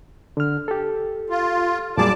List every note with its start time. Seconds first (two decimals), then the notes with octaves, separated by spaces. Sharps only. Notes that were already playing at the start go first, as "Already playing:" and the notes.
0.37 D3 F6
0.68 G4 A4
1.30 F4
1.97 F2 A#2 F#3 G3 G#4 D5 A5 D6